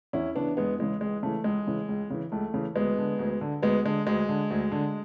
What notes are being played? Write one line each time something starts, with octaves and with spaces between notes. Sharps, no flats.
E2 C#4 E4
C#3 E3 B3 D4
E2 G#3 B3
C#3 E3 G#3
C#2 G#3
C#3 E3 A3
C#2 G#3
C#3 E3
C#2
C#3 E3
C#2 A3
C#3 E3
D2 G#3 B3
D3
D2
D3
D2 G#3 B3
D3 G#3
D2 G#3
D3
D2
D3